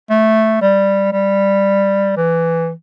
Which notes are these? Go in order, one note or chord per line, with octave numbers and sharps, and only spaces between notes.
A3
G3
G3
E3